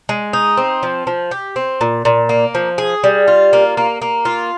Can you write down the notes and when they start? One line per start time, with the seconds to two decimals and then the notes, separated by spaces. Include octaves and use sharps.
0.09 G#3
0.33 D#4
0.57 C4
0.83 F3
1.07 F3
1.31 G4
1.56 C4
1.81 A#2
2.05 A#2
2.29 A#3
2.55 F3
2.78 G#4
3.04 G3
3.28 F4
3.53 A#3
3.77 A#3
4.02 A#3
4.25 F4